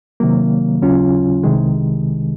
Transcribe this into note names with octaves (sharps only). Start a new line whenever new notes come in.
C3 D#3 F#3 A#3
D#2 C#3 F#3 C#4 F4
C2 C3 D#3 G#3